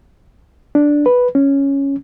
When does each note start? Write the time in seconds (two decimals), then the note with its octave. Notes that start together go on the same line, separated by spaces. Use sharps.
0.75 D4
1.06 B4
1.35 C#4